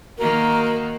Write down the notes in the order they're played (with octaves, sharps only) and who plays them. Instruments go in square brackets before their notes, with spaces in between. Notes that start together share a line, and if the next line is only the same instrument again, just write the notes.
[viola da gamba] D#3 A#3 F#4 [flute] A#4